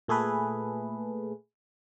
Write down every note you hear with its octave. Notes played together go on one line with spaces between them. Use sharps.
A#2 A3 G#4 A4 B4